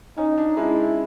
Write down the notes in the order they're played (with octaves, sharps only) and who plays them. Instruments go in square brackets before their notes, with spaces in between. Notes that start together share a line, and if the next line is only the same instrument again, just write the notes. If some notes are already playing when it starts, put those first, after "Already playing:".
[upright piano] C#4 [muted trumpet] D#4
[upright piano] D4
[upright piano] G#3 [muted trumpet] E4